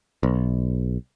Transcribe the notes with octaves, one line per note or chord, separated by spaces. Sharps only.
B1